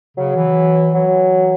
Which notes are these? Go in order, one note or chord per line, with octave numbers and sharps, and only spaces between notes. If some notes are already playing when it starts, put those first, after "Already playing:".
C#3 F#3
E3
E3 F#3